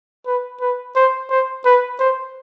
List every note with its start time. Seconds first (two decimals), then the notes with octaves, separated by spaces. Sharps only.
0.26 B4
0.61 B4
0.96 C5
1.30 C5
1.65 B4
1.99 C5